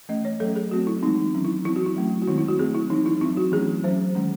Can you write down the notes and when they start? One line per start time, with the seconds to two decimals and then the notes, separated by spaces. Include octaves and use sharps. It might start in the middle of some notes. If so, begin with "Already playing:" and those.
0.09 E3 A3 C#4 D#5
0.25 C#5
0.40 F#3 A3 C#4 A4
0.55 G#4
0.71 F#3 A3 C4 F#4
0.87 E4
1.03 E3 G#3 C4 D#4
1.34 D#3 F#3 C#4
1.45 E4
1.65 E3 C4 E4
1.76 F#4
1.86 E4
1.96 F#3 A3 C#4
2.22 F#4
2.27 D#3 G#3 C4 E4
2.38 E4
2.49 F#4
2.59 F#3 A3 C4 G#4
2.75 E4
2.90 E3 C4 D#4
3.06 E4
3.21 F#3 C4 E4
3.37 F#4
3.52 E3 A3 C#4 G#4
3.84 F#3 C#4 C5
4.15 D#3 G#3 C#4